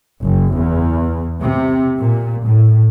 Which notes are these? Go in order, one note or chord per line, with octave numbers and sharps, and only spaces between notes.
F#1
E2
C3
A#2
A2